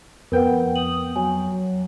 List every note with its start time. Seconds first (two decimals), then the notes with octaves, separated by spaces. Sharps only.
0.32 F2 B3 A#4 B4 F#5 G5
0.76 D#6 F#7
1.16 F#3 G#5